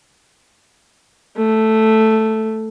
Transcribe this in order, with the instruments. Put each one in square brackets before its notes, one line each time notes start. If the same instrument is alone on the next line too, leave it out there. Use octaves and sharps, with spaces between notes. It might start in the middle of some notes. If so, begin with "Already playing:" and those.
[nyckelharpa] A3